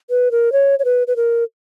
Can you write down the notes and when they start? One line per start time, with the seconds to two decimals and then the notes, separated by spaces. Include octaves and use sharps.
0.10 B4
0.31 A#4
0.52 C#5
0.79 C#5
0.85 B4
1.07 B4
1.16 A#4